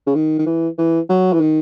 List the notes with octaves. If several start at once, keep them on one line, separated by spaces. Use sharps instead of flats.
C#3
D#3
D#3
E3
E3
F#3
E3
D#3